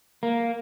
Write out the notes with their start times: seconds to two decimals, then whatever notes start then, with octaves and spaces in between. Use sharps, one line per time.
0.23 A#3